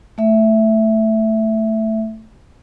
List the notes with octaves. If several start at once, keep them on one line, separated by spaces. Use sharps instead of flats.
A3 E5